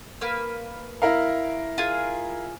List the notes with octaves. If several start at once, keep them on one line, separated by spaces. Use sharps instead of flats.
A#3 B4 F6
E4 A#4 F5
F4 G#4